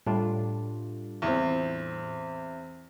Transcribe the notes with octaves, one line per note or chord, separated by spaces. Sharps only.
A2 G3 D4 F4
E2 C4